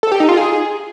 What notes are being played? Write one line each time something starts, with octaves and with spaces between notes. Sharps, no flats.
A4
G4
D#4
F4
G#4